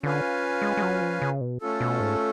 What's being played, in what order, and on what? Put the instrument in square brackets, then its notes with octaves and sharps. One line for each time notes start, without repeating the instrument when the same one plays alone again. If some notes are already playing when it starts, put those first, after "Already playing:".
[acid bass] D3 [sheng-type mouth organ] C#4 F4 B4 F5 G#5
[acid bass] G#3
G#3
F#3
F3
C#3
B2
[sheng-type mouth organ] A3 C#4 F4 A4
[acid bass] B2
G#2